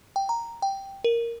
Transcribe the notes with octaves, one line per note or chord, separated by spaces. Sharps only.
G5
A#5
G5
A#4